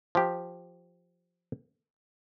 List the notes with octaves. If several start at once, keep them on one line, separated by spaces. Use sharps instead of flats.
F3 G4